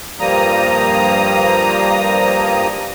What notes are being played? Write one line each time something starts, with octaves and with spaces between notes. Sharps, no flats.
G2 F3 G3 A#3 A#5 D#6